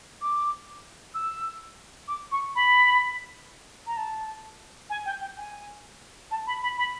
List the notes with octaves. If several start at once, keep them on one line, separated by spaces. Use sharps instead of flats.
D6
E6
D6
C#6
B5
A#5
A5
G#5
G5
G5
G#5
A5
B5
B5
B5